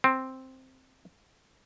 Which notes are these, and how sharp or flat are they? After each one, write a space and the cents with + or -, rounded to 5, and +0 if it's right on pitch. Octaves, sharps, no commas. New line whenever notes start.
C4 +0